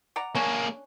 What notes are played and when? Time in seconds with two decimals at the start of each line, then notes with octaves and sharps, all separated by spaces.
0.16 D5 F#5 A#5
0.35 A#3 C#4 D4 G#4